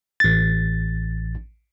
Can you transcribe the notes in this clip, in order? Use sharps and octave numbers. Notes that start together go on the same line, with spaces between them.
A1 A6